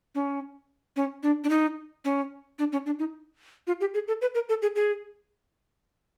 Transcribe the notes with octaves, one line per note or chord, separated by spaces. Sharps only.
C#4
C#4
D4
D4
D#4
C#4
D4
C#4
D4
D#4
F4
G4
G#4
A4
B4
A#4
A4
G#4
G#4